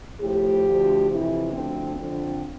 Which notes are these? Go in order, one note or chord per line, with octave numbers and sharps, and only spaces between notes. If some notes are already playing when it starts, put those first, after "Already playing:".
A2 F3 G4
D2 D3 F3
F2 C3 E3 E4
D2 D3 F3 C4
F2 D3 F3 C4